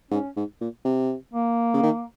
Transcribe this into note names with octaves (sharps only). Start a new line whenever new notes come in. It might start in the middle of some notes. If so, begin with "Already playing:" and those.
G#2 C#4
G#2
A#2
C3
A#3
C#3
D#3